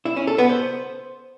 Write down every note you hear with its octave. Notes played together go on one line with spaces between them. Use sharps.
E4
C#4
A4
B3
C5